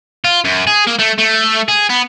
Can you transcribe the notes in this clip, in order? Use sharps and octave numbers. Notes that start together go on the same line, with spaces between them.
F4
F#2
G#4
A#3
A3
A3
G#4
B3